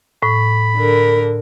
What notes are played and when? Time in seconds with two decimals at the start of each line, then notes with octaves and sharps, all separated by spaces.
0.23 A2 B5
0.77 D3 A#4